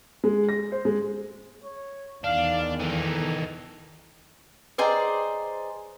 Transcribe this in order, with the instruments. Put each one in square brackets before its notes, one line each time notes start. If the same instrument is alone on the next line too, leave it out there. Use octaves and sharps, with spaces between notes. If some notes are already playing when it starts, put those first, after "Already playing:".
[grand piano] G#3
A#6
C5
G#3
[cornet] C#5
[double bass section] E2 D#3 [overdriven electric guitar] D4 [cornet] F5
[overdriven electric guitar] E3 D#4 [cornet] A4
[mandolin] G#4 C5 D5 [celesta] B4 D#5 A#5